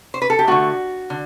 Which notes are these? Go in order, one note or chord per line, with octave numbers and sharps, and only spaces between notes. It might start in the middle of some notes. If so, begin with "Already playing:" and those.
C5
B4
A4
G4
D3 A3 F#4
D3